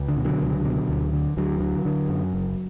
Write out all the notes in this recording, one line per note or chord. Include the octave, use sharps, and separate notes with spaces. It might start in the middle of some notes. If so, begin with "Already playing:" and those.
Already playing: C#2
D3
B2
D3 F#3
C#2
B2
D2
D3
D2 D3 F#3
D3
D3
F#2
F#1